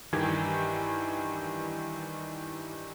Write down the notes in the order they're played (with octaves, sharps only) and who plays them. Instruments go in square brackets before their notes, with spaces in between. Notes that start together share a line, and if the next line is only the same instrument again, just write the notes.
[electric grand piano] G2 D#3 E3 G4 G#5 G#6